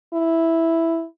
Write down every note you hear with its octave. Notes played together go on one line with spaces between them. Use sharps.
E4